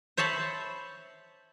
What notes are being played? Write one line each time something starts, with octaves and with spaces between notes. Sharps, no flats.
C5 C#5 E5 A5 B5